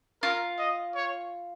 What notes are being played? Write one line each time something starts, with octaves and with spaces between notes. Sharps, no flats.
F4 A#4
D#5
C#5